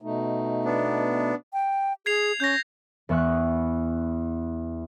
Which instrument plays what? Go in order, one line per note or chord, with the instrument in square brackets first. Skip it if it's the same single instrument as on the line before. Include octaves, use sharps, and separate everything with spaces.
[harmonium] B2 A3 D#4
[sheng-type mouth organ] B3 D4
[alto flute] G5
[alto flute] G#4 [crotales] G#6 C7 F7
[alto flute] C#4 [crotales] G6 A#6
[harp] E2 B3 E5 C#6 F#6